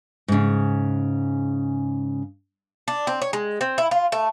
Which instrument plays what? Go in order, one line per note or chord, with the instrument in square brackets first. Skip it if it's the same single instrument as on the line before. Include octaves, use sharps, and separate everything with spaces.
[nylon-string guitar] G#2 C#3
[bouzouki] D4
C4
C#5
G#3
C4
E4
F4
A3